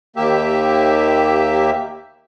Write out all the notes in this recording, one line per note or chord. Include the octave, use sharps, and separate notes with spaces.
D#2 A#3 G4 E5